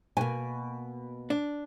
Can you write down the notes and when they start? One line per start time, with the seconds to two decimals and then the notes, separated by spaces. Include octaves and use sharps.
0.17 B2 A#3 G#5
1.30 D4